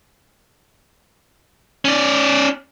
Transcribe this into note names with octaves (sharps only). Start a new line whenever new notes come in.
C#4 D5